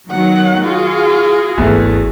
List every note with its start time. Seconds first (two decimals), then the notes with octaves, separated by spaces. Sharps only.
0.10 D#3 F#3 B3 F#5
0.64 F4 F#4 G#4
1.58 G#1 E2 E3 A3 A#3